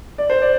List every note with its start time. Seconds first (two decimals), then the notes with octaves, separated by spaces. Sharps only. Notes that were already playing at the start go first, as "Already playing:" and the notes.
0.18 D5
0.30 C5
0.42 D5